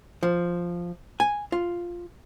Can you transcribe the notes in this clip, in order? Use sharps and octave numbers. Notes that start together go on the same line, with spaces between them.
F3
G#5
F4